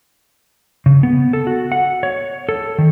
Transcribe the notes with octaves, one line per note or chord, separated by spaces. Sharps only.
C#3
B3
A4
F#4
F#5
C#5
A4
D#3